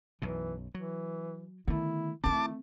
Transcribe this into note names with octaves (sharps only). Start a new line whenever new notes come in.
B1 F#2 B2 E3
E3 F#3
D3 D#3 A3 B3 E4
D#3 A3 C4 E4 A5 D6